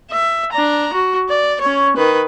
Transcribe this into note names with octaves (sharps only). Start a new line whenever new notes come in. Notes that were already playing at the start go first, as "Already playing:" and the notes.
E5
D4 A#5
F#4
D5
C#4 C#5
D#3 B4